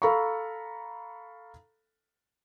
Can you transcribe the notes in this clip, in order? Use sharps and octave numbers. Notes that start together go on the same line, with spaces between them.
A4 F5 A#5 B5 C#6